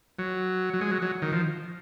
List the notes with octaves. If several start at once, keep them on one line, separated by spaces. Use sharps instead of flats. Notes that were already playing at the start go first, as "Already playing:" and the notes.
F#3
F#3
G#3
F#3
F#3
D#3
F3